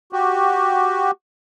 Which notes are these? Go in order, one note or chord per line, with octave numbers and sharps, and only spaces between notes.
F#4 G4